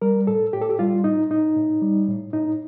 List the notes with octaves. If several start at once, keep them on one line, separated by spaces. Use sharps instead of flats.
G3 A#4
A2 A4
A2 G4
A4
G4
G3 F4
A2 D#4
A2 D#4
A2
G3
A2
A2 D#4